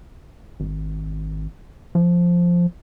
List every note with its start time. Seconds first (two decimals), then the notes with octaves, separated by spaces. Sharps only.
0.60 G#1
1.95 F3